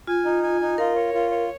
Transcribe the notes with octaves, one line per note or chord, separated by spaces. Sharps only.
F4 G#5
D#4
G#5
D#4
F4 A#4
C#5
F4
C#5